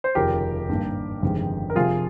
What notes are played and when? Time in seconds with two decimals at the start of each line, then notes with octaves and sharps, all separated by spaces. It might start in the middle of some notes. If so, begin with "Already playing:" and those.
0.04 C5
0.15 F1 D#2 C#3 F3 G4 A#4
0.69 G#1 G2 G3 A#3
1.22 G1 F2 C3 D#3 G#3
1.70 A#4
1.76 F1 F2 C3 F4 G#4